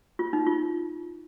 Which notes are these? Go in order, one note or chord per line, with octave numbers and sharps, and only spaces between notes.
F4
D#4
F4